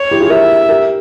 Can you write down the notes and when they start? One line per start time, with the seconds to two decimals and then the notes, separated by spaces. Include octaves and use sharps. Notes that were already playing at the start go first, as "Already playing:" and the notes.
Already playing: C#5
0.11 E4 G4
0.20 F4 G#4
0.30 G4 A#4 E5
0.69 G4 A#4